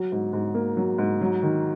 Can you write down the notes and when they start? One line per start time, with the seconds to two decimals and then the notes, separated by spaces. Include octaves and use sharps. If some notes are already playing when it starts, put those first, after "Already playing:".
Already playing: F#3
0.12 G#2
0.33 G#2
0.55 A#3
0.77 F#3
0.98 G#2
1.21 F#3
1.42 D#3